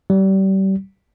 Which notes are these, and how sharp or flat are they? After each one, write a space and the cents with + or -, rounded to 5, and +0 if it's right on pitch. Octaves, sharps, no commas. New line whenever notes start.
G3 -30